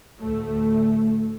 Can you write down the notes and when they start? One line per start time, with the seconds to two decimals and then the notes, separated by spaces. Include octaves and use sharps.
0.19 D2 A2 A3